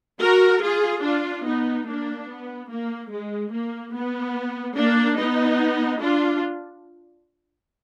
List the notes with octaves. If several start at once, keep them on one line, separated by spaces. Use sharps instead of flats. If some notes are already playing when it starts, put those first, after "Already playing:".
F#4 A#4
F4 G#4
D4 F4
B3 D#4
A#3 D4
B3
A#3
G#3
A#3
B3
A#3 D4
B3 D#4
D4 F4